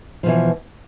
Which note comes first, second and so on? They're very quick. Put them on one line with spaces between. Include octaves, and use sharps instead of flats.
F3 B2 E3